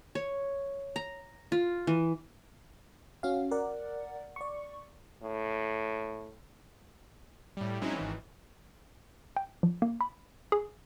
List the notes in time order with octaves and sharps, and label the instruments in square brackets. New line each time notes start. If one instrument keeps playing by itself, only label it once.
[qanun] C#5
A#5
F4
E3
[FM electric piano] C#4 F#4 F5
A#4 D5 F#5
D5 C#6
[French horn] A2
[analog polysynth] A2 G3
F#3 G#3 C4 C#4 D#4 E4
G#1 D#3 E3
[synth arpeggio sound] G5
F3
A#3
B5
G#4